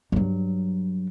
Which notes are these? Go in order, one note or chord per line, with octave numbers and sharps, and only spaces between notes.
G2 F#3